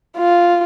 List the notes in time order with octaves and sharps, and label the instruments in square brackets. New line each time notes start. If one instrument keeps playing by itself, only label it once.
[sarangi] F4